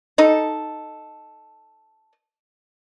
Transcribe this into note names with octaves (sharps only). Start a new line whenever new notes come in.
D#4 A4